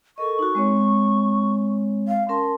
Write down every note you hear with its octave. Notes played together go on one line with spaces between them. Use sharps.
A4 A#4 D#5 C#6
D#4 F#4
G#3 C4 C#5
F5
C#4 A#4 A5 C6